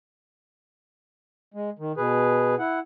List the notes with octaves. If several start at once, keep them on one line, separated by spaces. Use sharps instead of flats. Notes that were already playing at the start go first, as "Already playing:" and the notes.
G#3
D#3
B2 G#4 B4
E4 F#5